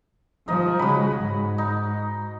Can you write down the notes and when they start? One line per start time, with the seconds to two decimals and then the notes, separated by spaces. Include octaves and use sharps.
0.48 F3 D#4 D#5
0.79 C#3 G#3 F#4 B5
1.13 G#2
1.58 D#4